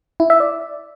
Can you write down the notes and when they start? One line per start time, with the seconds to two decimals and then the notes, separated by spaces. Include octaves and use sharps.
0.20 E4
0.30 E5
0.40 D5